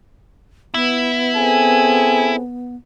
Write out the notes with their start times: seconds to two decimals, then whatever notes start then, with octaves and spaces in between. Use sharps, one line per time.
0.74 B3 E4
1.36 C4 G#4 A4 G#5